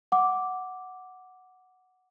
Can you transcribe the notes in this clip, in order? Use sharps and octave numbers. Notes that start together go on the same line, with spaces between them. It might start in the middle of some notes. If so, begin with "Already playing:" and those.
F#5 D6